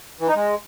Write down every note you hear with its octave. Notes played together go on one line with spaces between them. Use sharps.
E3
D#4
G#3